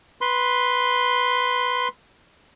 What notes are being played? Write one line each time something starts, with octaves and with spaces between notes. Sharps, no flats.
B4 C6